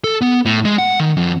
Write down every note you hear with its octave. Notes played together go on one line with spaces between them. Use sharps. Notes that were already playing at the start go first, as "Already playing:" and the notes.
A4
B3
A2
G#3
F#5
D#3
F2